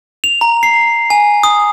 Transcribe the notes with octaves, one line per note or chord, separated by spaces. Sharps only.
F7
A#5
C7
G#5
D#6